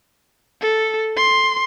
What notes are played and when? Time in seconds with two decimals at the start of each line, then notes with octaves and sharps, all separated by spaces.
0.61 A4
1.17 C6